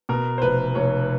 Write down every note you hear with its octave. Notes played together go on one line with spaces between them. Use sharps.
B2 A#4
C5
F1 B4
F1 C#5